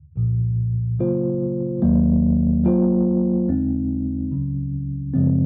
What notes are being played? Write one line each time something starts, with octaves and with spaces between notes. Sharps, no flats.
C2 A#2 F3
C#3 F#3 A#3 F4 C5
D#2 D#3 F#3 A#3
F#3 A#3 F4 C5
D#2 C#3 G#3 C4 D#4
C#2 C#3 F#3 C#4
F#2 C#3 F3 G#3 C4